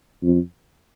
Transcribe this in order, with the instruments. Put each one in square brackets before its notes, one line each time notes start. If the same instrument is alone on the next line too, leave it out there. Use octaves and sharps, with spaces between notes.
[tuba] F2